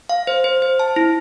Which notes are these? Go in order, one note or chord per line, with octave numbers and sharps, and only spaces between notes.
F5
C5
C5
C5
A5
E4